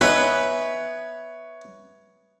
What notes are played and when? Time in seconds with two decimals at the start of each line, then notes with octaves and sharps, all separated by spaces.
0.01 B3 D#4 B4 C#5 E5 G#5 F#6